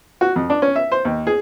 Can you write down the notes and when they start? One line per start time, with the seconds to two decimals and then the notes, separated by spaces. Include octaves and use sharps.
0.21 F#4
0.36 F2
0.50 D4
0.62 C#4
0.76 E5
0.92 C5
1.05 D#2
1.27 G#4